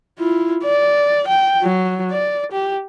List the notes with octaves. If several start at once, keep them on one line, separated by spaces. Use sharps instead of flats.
E4 F4
D5
G5
F#3
D5
G4